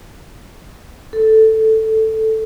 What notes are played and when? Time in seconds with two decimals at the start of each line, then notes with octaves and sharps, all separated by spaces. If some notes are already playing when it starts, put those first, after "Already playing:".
1.13 A4